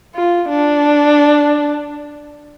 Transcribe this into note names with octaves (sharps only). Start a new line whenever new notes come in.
F4
D4